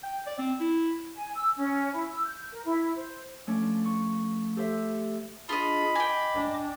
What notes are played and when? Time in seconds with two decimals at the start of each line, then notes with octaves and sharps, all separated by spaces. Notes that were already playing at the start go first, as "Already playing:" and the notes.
0.03 G5
0.27 D5
0.38 C4
0.60 E4
1.17 G#5
1.35 E6
1.56 C#4
1.94 E4
2.12 E6
2.25 G6
2.51 A#4
2.65 E4
2.96 C5
3.47 F3 A3 C#4 D4
3.85 C#6
4.56 G4 A4 C5 E5
5.49 D4 F4 G#4 D#5 B5
5.95 D#5 G5 G#5 D6
6.34 D4